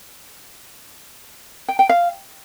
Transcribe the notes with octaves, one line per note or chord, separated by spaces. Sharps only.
G5
G5
F5